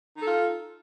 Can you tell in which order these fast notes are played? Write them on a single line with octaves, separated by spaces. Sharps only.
D#4 A4 F4